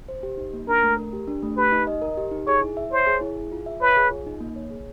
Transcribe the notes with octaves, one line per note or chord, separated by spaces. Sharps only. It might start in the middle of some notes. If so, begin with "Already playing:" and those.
C5
G4
D#4
A#3
D4 A#4
A3
A#4
G4
D4
A3
G4 B4
D#4
D#5
A#4
G4
D#4
G#4 C#5
E4
E5
C5 C#5
G#4
E4
G#4
F4
E5
B4 C#5
G#4
F4
D#4
A#3
C#5
G#4